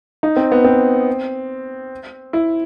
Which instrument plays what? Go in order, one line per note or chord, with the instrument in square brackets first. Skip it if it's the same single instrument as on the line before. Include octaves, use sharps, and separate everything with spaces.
[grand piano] D#4
C4
B3
C4
E4